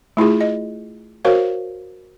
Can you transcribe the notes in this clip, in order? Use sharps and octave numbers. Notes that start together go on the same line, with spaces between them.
A3 E4 F4 G#4
D#5
F#4 A#4 C5 C#5 F5